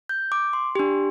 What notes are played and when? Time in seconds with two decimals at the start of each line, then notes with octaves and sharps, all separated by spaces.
0.09 G6
0.32 D6
0.53 C6
0.75 D4 G4